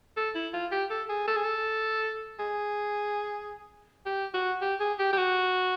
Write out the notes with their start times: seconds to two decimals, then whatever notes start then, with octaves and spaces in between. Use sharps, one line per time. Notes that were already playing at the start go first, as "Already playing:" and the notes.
0.17 A4
0.35 E4
0.53 F4
0.72 G4
0.91 A4
1.09 G#4
1.28 A4
1.36 G#4
1.44 A4
2.39 G#4
4.06 G4
4.34 F#4
4.61 G4
4.80 G#4
4.99 G4
5.13 G4
5.17 F#4